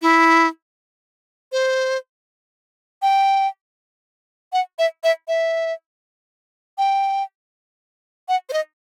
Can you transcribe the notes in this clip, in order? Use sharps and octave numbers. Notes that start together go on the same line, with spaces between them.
E4
C5
G5
F#5
E5
E5
E5
G5
F#5
C5
D#5